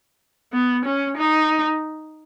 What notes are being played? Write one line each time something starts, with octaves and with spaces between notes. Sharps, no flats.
B3
C#4
D#4